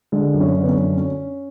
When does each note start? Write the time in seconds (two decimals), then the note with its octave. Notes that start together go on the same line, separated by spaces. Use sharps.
0.12 D3 G#3
0.34 F#2
0.40 C#4
0.55 D3
0.63 B3
0.69 C#4
0.76 F#2
0.98 C#4